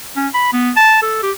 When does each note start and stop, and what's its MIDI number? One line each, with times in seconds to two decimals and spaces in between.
0.16 0.28 61
0.34 0.51 83
0.53 0.71 59
0.76 0.98 81
1.02 1.23 69
1.23 1.32 67